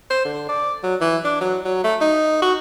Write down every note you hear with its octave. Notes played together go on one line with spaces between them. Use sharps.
C5
D3
D5
F#3
E3
D4
F#3
F#3
A3
D#4
F#4